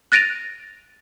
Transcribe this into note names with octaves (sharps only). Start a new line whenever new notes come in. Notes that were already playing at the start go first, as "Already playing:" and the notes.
F#6 A6 A#6 D7 D#7 F7